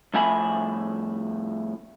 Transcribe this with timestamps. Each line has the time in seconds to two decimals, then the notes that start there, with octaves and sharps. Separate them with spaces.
0.14 F2 A2 E5 G#5 B5